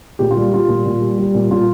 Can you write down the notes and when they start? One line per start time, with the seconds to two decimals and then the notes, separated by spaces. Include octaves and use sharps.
0.19 A#2 G4
0.31 F4
0.36 G3
0.52 G3 F4
0.68 A#2
0.86 A#2
1.01 G3
1.18 G3
1.35 A#2
1.50 A#2 F4